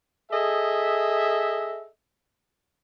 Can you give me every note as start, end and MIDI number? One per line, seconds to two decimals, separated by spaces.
0.31 1.88 68
0.31 1.88 69
0.31 1.88 75
0.31 1.88 76